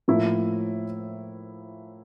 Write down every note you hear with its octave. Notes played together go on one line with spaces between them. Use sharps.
A2 F3 A#3 E4